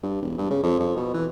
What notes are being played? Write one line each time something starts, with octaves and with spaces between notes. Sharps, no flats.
G2
E1
G2
C#3
F2
F2
B2
E3